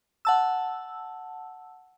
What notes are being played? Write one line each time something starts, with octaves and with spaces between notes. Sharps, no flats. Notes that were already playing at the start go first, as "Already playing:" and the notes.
F#5 A5 E6